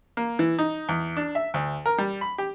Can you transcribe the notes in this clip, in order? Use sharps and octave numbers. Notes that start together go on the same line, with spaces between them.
A#3
E3
D#4
E2
D4
E5
D2
A#4
G3
B5
G4